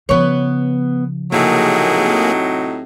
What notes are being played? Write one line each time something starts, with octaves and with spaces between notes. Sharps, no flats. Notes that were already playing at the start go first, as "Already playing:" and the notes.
C#3 F3 B3 C#5
A2 C3 F#3 A#3 D#4 G#4